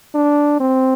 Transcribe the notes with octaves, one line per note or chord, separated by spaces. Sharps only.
D4
C4